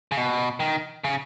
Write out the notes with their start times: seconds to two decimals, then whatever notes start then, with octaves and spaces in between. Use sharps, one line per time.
0.12 C#3
0.17 B2
0.60 D#3
1.04 C#3